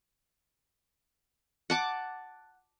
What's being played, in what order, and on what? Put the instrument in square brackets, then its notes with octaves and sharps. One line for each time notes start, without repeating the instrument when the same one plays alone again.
[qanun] F#5 A5 D6